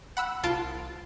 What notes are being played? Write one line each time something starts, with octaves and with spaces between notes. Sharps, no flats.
F#5 B5 E6 F#6
C2 F4 A5 D7